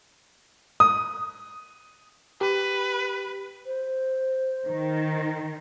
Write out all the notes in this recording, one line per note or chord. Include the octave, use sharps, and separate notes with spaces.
D#6
G4 B4
C5
D#3